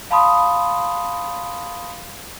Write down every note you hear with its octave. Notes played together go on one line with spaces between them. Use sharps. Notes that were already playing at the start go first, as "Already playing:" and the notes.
F5 A5 B5 C6 D#6